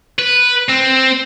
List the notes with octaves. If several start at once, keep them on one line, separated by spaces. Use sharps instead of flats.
B4
C4